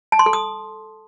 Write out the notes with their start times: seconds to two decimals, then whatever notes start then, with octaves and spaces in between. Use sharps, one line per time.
0.12 A5
0.19 C6
0.26 A4
0.33 D#6